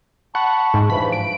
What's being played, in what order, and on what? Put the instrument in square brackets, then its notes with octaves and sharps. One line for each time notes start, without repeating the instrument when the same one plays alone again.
[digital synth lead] F#5 [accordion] A5 B5 C#6
[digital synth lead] G#2
[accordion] G2 E3 F3 [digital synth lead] B5
[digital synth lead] D7